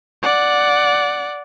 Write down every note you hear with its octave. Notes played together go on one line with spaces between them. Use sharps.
D5 F#5